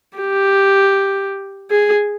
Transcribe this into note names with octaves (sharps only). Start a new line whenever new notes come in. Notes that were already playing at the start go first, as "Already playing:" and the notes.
G4
G#4